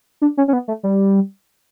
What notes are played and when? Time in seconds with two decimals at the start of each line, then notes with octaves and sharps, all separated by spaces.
0.22 D4
0.37 C#4
0.48 C#4
0.53 B3
0.68 A3
0.83 G3